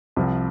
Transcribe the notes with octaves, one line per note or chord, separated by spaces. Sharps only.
C2 C3 F3